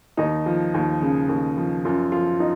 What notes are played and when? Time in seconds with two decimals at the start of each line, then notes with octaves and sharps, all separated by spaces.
0.17 D#2 D#4
0.46 F3
0.74 D#2
1.01 C#3
1.29 D#2
1.57 F3
1.85 F#2 F4
2.12 F3 F4
2.40 D#4